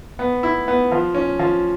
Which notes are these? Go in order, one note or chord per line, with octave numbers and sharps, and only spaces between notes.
B3
E4
B3
F3
C#4
F3